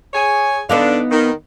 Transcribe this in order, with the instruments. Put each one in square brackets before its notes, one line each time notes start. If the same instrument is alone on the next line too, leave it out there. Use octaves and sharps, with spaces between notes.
[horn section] G#4 C#5 G#5
[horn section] D3 D4 [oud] B3 D#4 F5
[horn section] D#3